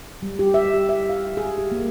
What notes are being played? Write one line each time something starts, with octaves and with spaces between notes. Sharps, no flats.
G3
G4
E5
G4
E5
F5
G#4
G4
A#3